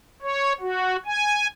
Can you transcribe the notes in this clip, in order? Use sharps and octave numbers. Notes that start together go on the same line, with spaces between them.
C#5
F#4
G#5